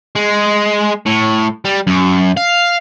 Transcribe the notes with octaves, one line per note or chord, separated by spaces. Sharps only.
G#3
A2
G3
F#2
F5